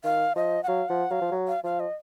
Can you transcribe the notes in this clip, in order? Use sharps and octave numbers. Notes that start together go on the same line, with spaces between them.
D#3 F5
F3 D#5
F#5
F#3 F5
F3 F#5
F#3 F5
F3
F#3
F5
F3 F5
D#5